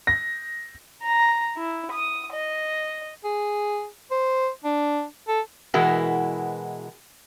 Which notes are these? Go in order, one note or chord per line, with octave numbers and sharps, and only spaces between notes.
A#6
A#5
E4
D#6
D#5
G#4
C5
D4
A4
B2 E3 G#3 E4 F#4 A#4